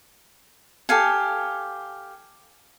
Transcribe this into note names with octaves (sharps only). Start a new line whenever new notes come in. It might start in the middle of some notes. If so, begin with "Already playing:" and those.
G4 A4 F5 G#5